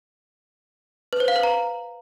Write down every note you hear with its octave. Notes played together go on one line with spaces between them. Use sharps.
B4
C5
F5
B4
A#5